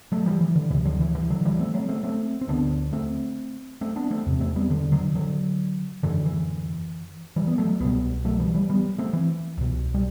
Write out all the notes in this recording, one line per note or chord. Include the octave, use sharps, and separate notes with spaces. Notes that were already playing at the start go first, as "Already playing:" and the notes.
F#3 A3
E3 G3
E3
D3
D2 C3 E3
D3 F#3
E3
E3
D3 F#3
E3 G3
A3 C4
F#3 A3
A3 C4
A3 C4
C4
D2 D3 B3 D4
A3 C4
A3 C4
B3 D4
A3 C4
E2 C3
A3 C4
G3 B3
D3
D3 F#3
D3 F#3
F#2 D3 E3
E3
E3 G3
B3
F#3 A3
C2 B2 G3 B3
F#3 A3
E3 G3
E3 G3
G3 B3
A3 C4
E3
C2 B2
G3